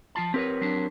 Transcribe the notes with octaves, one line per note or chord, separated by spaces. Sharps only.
F3 F4 A5
C4 G4 A#4 B4 C#5
F#3 D4 G4